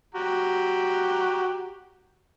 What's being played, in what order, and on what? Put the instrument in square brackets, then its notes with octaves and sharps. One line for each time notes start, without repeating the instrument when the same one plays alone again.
[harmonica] F#4 G4 A#5